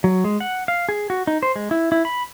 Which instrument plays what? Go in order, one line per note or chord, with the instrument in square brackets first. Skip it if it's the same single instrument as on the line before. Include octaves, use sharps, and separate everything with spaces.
[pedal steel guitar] F#3
G#3
F#5
F5
G#4
F#4
D#4
C5
G#3
E4
E4
B5